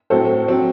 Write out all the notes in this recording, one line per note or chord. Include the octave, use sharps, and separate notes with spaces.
A2 F#3 C4 A4 C5
F#3 C4